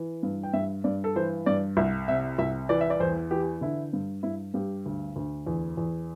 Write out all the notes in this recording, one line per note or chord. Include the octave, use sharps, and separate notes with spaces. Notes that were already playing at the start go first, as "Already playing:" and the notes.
Already playing: E3
G2
G5
G2 E5
G2 D5
A4
E3 C5
G2 D5
C2 E5
C3 E5
C2 E5
E3 D5
E5
D5
E2 C5
E3 G4
D3 E4
G2
G2 E4
G2 G4
D2
D2
E2
E2